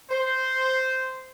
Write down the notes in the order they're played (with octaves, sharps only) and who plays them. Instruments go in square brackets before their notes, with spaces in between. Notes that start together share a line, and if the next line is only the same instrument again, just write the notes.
[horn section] C5